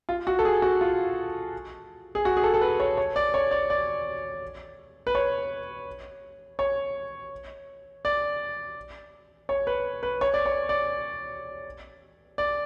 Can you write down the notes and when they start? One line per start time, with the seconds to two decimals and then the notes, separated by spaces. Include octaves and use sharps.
0.09 F4
0.27 F#4
0.39 A4
0.45 G#4
0.62 F#4
0.81 F4
2.15 G#4
2.25 F#4
2.37 G#4
2.43 A4
2.54 A4
2.61 B4
2.80 C#5
2.97 C#5
3.16 D5
3.34 C#5
3.51 D5
3.70 D5
5.07 B4
5.15 C#5
6.59 C#5
8.05 D5
9.49 C#5
9.67 B4
10.03 B4
10.21 C#5
10.34 D5
10.46 C#5
10.69 D5
12.38 D5